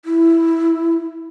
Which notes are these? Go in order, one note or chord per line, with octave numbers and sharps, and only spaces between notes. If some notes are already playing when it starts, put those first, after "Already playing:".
E4